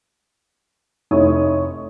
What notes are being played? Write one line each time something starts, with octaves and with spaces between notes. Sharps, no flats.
F1 D#4 E4 C#5 D#6